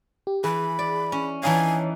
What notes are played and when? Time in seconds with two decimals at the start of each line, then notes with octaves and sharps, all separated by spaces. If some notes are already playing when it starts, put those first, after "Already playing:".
0.27 G4
0.44 E3 G#4 B5
0.79 D5
1.12 C#4
1.43 E3 D#4 C#5 F5 G#5 A5